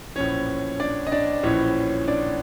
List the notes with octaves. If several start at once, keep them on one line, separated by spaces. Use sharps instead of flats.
A#1 A2 E3 C#4 C#5
D4 D5
D#5
D4 D5
A#1 A2 E3 C#4 C#5
D4 D5